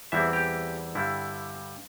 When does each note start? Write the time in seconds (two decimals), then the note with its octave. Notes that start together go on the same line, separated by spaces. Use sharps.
0.12 E2 E3 G3 C4 E4 E5
0.33 G4
0.95 G2 D3 G3 E4